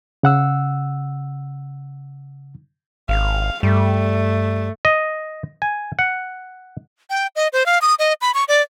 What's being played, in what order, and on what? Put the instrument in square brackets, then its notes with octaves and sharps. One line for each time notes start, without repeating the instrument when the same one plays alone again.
[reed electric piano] C#3 F#5 E6
[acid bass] G#1 [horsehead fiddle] F5
[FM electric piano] G2 [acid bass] G3 [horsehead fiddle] A3
[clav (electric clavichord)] D#5
G#5
F#5
[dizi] G5
D#5
C5
F5
D#6
D#5
B5
C#6
D5